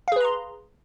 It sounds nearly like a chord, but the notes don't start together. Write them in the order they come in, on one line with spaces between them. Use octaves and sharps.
F5 G#4 B4 A#5 C6